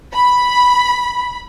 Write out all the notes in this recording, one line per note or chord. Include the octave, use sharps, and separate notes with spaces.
B5